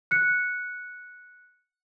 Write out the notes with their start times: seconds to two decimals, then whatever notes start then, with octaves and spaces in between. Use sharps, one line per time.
0.11 F#6 C#7